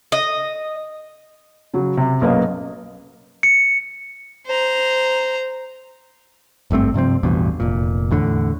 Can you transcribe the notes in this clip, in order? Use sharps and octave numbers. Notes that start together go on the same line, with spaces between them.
D#5
C#3 F#3
C3
B1 A#3 B3 C#4 D#5 F5
C#7
C5 A#5
G#1 G2 A3 C4
G2 C3 F3 C4
A1 E2 G2 B2
F1 A#2
E2 A2 D3